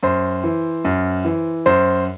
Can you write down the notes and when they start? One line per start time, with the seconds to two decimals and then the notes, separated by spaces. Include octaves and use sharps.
0.03 F#2 C5
0.44 E3
0.85 F#2
1.25 E3
1.66 F#2 C5